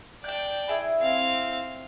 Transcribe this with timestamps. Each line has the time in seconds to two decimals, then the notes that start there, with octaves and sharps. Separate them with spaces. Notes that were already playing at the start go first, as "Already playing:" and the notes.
0.24 D4 D5 G5 G6
0.69 E4 G#4
1.01 C4 F5